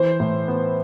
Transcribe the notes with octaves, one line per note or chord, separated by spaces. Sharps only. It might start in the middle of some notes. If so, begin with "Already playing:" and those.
Already playing: E3 C5
A2
B3